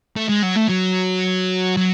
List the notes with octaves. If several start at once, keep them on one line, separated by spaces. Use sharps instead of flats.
A3
G#3
F#3
A3
F#3
F#3